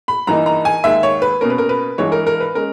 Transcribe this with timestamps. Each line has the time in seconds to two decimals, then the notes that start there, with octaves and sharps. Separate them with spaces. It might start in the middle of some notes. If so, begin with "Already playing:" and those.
0.08 B5
0.27 G2 E3 A#3 D#4 A#5
0.46 A#5
0.65 G#5
0.84 D#2 D#3 G#3 E5
1.03 C#5
1.22 B4
1.41 B2 A#3 C#4 A#4
1.50 B4
1.58 A#4
1.69 B4
1.98 G2 E3 G#3 C#5
2.12 A#4
2.27 A#4
2.40 B4
2.55 G#3 C#4 A#4